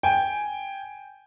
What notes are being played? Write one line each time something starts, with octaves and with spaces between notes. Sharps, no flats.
G5 G#5